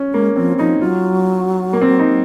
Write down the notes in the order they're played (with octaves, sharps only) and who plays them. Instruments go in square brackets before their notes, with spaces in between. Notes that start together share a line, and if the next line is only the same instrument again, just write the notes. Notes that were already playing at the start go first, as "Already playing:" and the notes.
Already playing: [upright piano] C#4
[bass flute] G#3 [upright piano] A#3
[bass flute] F3 [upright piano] C4
[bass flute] F3 [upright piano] D#4
[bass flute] F#3 [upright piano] F4
[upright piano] A#3
C4
D#4